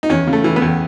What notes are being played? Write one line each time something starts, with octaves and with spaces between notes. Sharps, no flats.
D#4
E2 C#4
C#3
A3
E3
B3
E2